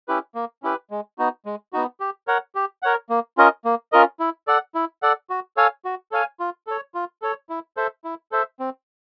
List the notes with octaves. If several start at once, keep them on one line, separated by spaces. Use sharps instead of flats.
C#4 E4 G4 B4
A#3
C#4 E4 G4 B4
G#3
B3 D#4 F#4
G#3
B3 D#4 F#4
G4
A#4 C#5 F#5
G4
A#4 C#5 F#5
A#3
C#4 F4 A#4 D#5
A#3
C#4 F4 A#4 D#5
E4
A4 D5 F#5
E4
A4 D5 F#5
F#4
A4 C#5 F5 G#5
F#4
A4 C#5 F5 G#5
F4
A4 C#5
F4
A4 C#5
E4
A4 C5 E5
E4
A4 C5 E5
C4